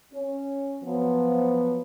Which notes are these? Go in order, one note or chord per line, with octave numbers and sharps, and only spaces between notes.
C#4
F3 F#3 B3